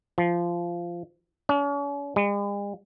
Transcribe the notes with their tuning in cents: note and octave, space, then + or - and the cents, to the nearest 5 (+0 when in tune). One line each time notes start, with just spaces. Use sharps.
F3 -15
C#4 +40
G#3 -45